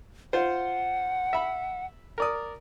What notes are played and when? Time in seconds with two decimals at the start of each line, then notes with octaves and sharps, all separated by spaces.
0.33 F4 C5 F#5
1.33 E5 B5
2.18 A#4 D5 D#6